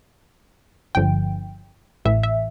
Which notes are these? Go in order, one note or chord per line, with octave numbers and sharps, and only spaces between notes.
G1 G2 D3 F3 G5
A1 A2 E3 E5
E5